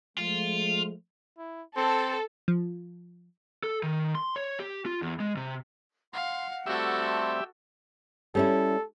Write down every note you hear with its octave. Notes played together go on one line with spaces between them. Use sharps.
F3 G#3 A3 F4
E4
C4 A4
F3
A4
D#3
C6
C#5
G4
F4
E2
G#3
C3
F5 F#5 C6
G3 A3 C4 F#4 G4 A4 E5
A5 C6
G3 C#4 E4 A4